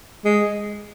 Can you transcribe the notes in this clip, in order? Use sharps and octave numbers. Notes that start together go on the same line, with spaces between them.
G#3